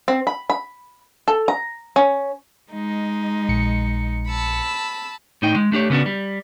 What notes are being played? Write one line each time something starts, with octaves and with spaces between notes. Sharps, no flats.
C4
B5
B5
A4
A#5
C#4
G#3 D#4
A#1 C#7
A5 B5 E6
A2 D#4 G5
G#3
A3 D4 G4 C#5
C#3 B3 C#4 D4 F#4
G3